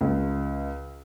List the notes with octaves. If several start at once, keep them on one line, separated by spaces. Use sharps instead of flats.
C#2